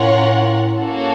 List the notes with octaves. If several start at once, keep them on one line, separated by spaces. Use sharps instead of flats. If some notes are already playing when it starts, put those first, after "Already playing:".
Already playing: A2 C#4 F4 A#4 C#5 F#5
A#3 C#4 F#4 A4